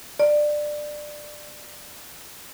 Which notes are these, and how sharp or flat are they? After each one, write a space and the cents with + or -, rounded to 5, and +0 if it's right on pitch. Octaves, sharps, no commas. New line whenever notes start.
D5 +15